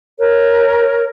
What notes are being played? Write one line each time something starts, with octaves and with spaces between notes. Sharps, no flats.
A#4 C#5